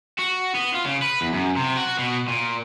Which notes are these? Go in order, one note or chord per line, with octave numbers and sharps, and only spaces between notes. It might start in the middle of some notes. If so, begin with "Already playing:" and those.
F#4
B3
F4
C#3
B4
E2
F#2
C3
F#4
B2
A#2